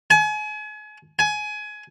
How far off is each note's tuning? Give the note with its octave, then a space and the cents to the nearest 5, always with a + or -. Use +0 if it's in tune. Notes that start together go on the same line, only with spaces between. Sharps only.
G#5 +35
G#5 +20